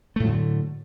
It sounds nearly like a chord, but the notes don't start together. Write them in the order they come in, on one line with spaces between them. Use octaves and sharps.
A3 A2 F#3 D3